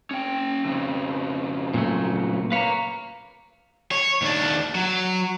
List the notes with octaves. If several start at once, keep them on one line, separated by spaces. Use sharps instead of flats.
C#4 G5
F2 C#3
A#2 F#3 A3
B4 C#5 F5 A#5
C#5
D#2 D4
F#3